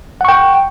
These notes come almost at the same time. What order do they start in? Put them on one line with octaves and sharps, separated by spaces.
F#5 C#6 G5